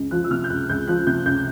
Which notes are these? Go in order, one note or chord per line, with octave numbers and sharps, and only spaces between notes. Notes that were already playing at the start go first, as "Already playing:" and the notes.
Already playing: C#2
F3 F#6
E6
C3 F6
G6
C#2 F#6
C#2 G6
F3 F#6
C3 G6
C#2 G6